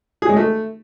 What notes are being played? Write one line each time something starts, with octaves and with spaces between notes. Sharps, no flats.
G#4
G#3
A3